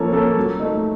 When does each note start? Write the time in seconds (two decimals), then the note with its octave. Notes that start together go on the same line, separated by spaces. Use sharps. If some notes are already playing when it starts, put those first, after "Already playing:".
Already playing: F3 A#3 C#4 A4 C#5
0.12 A#3 C#4 A4 C#5
0.36 F#3
0.60 A3 D#4